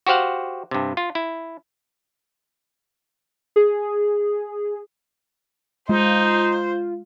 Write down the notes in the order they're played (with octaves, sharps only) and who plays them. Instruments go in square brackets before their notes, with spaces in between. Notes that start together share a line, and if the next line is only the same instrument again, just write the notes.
[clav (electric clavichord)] F#4 G4 C5 F5 F#5
G2 C3
F4
E4
[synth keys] G#4
[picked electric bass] G#3 [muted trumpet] D#4 [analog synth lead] F4 [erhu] C5